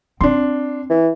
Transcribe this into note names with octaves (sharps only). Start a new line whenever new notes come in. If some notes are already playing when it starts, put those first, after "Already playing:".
C4 D4 C6
E3